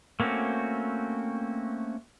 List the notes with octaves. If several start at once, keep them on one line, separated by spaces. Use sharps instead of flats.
A3 A#3 C4 C#4 F#4